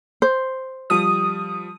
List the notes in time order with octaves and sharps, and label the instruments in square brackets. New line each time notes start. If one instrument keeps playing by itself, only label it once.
[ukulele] C5
[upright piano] F3 G3 [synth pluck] D#6